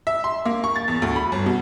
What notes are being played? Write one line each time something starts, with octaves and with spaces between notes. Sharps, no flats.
E5
C6
A#3
C#6
A6
E2
D2
B5
G1
B2